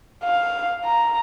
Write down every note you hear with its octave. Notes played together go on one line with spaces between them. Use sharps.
F5
A#5